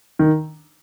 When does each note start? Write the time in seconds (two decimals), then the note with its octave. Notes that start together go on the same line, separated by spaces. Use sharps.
0.19 D#3